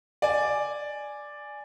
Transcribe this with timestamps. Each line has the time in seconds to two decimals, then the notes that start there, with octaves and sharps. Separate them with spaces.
0.22 D5 G#5